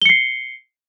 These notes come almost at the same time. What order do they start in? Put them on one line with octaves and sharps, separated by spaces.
G7 C#7 C7